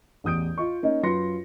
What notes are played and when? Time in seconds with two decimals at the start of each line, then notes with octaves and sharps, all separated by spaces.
0.24 A1 E2 D#6 G6 D7
0.58 F4 D#5 C#6
0.83 A#3 C#4 D#4 D#5
1.03 F#2 F4 B4 C6 A#6 C#7